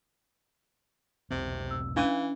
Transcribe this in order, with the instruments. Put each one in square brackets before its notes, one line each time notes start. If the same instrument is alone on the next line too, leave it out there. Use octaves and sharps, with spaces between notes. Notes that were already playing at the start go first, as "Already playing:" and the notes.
[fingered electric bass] E1 B1 C4 [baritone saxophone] C3
[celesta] E6
[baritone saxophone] E3 [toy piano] C#4 D4 [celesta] F5